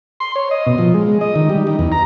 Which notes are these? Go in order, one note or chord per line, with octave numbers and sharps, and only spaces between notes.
C6
C#5
D#5
B2
F3
G#3
D#5
D#3
G3
D#4
E2
A#5